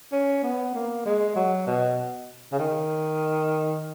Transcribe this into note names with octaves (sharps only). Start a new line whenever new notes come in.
C#4
B3
A#3
G#3
F#3
B2
C#3
D#3